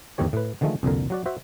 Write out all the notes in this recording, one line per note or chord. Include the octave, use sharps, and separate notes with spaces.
E2 G#2 D#3 G4 C#5
A2 B4
D3 D#3 F3 G#3 A3
C2 F2 A#2 D3 A#4
F#3 F#4 D5
F#4 C5 E5